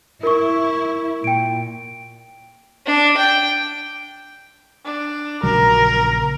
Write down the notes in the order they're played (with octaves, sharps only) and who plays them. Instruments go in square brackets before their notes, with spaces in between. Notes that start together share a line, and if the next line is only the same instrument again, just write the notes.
[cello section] E4 [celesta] A#4 C#6
[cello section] A#2 [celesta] G5 D7
[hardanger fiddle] D4
G5
[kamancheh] D4
[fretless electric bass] A#1 C#3 F#3 [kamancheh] A#4